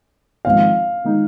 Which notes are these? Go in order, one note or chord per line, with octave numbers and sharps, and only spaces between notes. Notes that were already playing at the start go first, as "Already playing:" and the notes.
G#1 G#2 F3 G#3 F5
D#3 G#3 D#4